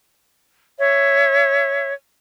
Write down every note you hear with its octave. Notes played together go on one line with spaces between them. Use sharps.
C#5 E5